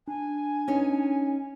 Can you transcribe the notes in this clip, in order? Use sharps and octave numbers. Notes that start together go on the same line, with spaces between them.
D4 G#5
C#4 D#4 C#5